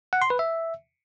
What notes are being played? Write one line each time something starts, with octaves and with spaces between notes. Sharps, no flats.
F#5
C6
B4
E5